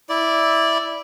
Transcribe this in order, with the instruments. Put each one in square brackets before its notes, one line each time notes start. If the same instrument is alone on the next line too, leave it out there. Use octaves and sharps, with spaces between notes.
[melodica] E4 D5